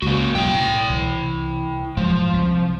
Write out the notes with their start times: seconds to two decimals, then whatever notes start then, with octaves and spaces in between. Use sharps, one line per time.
0.02 C#2 A#3 F#4
0.35 B1 F2 C3 E4 G5
0.54 A2
0.90 C2 E3
1.97 F1 G#2 F3 F#3
2.34 C2